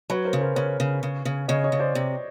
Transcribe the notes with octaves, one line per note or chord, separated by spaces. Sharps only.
F#3 B4 C#5
A#4 C5
C#3
A#4 C5
C#3 B4 C#5
C#3
C#3
C#3
C#3 C#5 D#5
C#5 D#5
C#3
C5 D5
C3